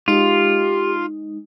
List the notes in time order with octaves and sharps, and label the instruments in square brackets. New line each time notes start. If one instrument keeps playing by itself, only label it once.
[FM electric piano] G#3 D#4 [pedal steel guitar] F4 [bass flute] G4